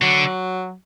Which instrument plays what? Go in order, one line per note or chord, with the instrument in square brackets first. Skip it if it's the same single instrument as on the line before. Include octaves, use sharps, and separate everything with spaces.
[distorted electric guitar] D3 [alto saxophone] F#3